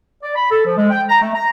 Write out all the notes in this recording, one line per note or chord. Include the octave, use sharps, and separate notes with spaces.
D5
B5
A4
F3
G#3
G5
A#5
A3
A#5